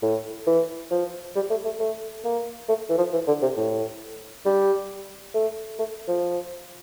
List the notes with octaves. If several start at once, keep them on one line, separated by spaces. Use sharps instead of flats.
A2
E3
F3
G3
A3
A3
A3
A#3
A3
E3
F3
E3
D3
C3
A2
G3
A3
A3
F3